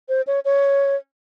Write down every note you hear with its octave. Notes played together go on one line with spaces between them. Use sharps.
C5
C#5
C#5